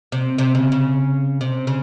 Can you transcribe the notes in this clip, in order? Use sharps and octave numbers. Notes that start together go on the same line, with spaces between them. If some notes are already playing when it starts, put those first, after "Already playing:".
C3
C3
C#3
C#3
C3
C#3